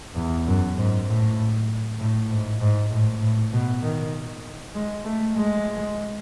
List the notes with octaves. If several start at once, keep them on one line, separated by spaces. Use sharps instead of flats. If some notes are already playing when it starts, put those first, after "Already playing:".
E2
F#2
G#2
A2
A2
G#2
G#2
A2
A2
B2
D#3
G#3
A3
G#3